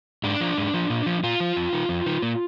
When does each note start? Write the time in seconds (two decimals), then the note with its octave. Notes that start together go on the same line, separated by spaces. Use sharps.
0.24 G#2 D4
0.41 F3
0.57 G#2
0.74 F3
0.90 A#2
1.06 F3
1.23 A#2 F4
1.40 F3
1.56 F2
1.73 D#3
1.89 F2
2.06 D#3
2.22 A#2